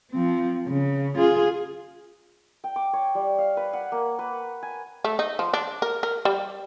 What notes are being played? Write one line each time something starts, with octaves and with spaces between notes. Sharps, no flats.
F3 C4
C#3
F4 G#4
G5
D6
C#5
G3
F5
B4
F#5
A#3
B4
G#5
A3
D#4
F3
D4
A#4
A#4
G3